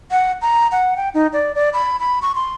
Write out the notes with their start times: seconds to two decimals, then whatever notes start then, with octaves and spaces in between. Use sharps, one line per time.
0.11 F#5
0.42 A#5
0.72 F#5
0.97 G5
1.14 D#4
1.33 D5
1.55 D5
1.73 B5
1.99 B5
2.22 C#6
2.35 C6